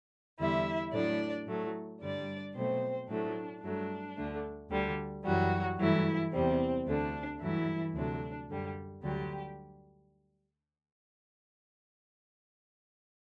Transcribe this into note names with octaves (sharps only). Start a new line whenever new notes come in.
E2 D3 G3 E4 E5
A2 F#3 A3 D4 D5
A2 F#3 A3
G2 D3 G3 D4 D5
B2 F#3 A3 C4 C5
A2 F#3 A3 D4
G2 F#3 A3 D4
D2 D3 A3
D2 D3 G3
F#2 E3 F#3 G3 F#4
G2 E3 F#3 A3 E4
E2 C3 G3 C4
D2 D3 A3 D4
G2 E3 F#3 A3 E4
D2 C3 F#3 A3 D4
F#2 D3 G3
D2 D3 F#3 G3 G4